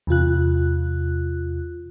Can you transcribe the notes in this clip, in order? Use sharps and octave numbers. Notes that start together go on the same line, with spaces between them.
E2 C3 F4 F#6